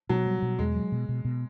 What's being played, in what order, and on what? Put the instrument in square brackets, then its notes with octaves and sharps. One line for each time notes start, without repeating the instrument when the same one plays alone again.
[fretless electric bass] B2 [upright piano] F#3
[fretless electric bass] G3
B2
[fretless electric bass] E2 [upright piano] G#3
[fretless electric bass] F#3
B2
B2
B2